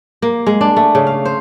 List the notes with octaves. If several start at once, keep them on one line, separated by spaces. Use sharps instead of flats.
A#3
G#3
D4
A3
C#3
F5
C5